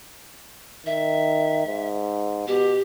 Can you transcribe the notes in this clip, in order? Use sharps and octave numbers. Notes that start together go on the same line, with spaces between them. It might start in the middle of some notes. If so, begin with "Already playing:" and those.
D#3 E5
G#2
B2 G4